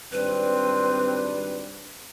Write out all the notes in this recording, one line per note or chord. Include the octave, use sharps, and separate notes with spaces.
G#1 G3 C4 D4 B4